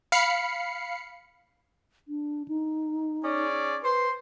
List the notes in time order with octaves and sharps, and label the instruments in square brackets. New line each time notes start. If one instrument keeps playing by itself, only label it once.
[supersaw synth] F5 B5 C7 C#7
[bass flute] D4
D#4
[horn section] C#4 G#4 D5
[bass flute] B4 [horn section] C5 C6